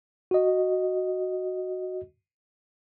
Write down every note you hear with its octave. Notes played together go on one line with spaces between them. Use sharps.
F#4 D#5